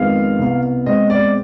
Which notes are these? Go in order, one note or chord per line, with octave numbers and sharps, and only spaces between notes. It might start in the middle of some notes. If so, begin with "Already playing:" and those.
Already playing: F2 D#3 G#3 B3 F5
C2 B2 B3
B2 G#3 C4 D#5
D5